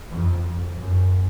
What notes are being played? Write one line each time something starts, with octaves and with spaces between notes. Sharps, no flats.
F2
F#2